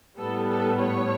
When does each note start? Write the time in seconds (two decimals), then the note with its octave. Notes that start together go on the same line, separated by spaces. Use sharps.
0.18 A2 G3 B3 A4
0.48 A4
0.79 C#5